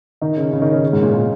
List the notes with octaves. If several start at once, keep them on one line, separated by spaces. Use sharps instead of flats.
D#3 D#4
C#3 C#4
C#3 C#4
D#3 D#4
C#3 C#4
C#3 C#4
G#2 G#3
A#2
A#2